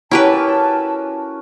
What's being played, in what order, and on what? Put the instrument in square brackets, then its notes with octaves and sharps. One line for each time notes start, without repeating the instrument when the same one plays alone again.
[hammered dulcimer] C#4 F#4 A#4 [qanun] E4 G4 B4 [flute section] A5